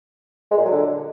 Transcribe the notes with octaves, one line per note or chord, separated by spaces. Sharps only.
G#3
A#2
F#3
D3